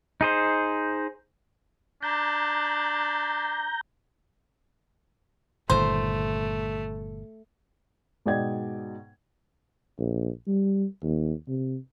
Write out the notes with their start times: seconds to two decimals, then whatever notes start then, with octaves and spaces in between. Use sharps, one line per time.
0.21 D#4 G#4 C5
2.03 D4 A#5 G6
5.70 G1 A#2 D#3 A3 C5
8.26 G#2 B2 D5 D#5 G5 G#6
9.99 A#1
10.47 G3
11.03 D#2
11.48 C3